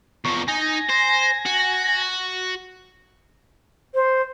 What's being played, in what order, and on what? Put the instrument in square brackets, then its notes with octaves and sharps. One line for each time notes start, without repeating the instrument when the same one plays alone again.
[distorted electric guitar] E2 F3 [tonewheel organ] A#5 C#6
[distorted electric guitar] D#4 [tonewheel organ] G#5 A#6
[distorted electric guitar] C5
F#4
[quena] C5